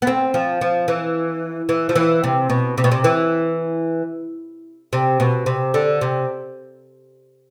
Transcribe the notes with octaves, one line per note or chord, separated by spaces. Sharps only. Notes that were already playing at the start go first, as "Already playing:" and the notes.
B3
C4
F3
F3
E3
E3
F3
E3
C3
B2
C3
B2
C3
E3
C3
B2
C3
D3
C3